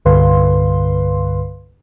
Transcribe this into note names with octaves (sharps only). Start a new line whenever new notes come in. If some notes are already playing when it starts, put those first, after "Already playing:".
C2 G2 D3 B4 F5 C6